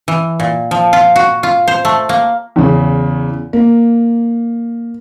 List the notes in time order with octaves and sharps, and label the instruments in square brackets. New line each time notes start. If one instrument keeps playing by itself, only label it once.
[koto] E3
A#2
F3
F4
F#4
F4
C5
A3
A#3
[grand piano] E2 C#3
A#3